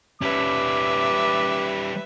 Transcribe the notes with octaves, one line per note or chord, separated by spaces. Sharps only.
G3 C#4 B4 E5 D6